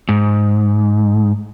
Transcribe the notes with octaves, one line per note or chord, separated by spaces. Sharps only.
G#2